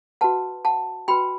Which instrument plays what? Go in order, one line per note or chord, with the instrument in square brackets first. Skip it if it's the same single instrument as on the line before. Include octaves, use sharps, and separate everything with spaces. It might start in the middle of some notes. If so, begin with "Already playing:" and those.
[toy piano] F#4 B4 F#5 A5
F#5 A5
F#4 B4 G5 B5